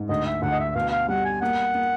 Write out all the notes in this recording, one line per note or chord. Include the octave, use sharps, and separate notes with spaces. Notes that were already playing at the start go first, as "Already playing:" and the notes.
Already playing: G#2
D2 D#5
E5
D2 F#5
D#5
E5
B2 F5
F5
G3 F#5
G#5
A#3 F#5
A#3